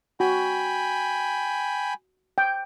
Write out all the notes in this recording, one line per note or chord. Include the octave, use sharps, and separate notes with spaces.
F#4 G5 G#5 B5
G5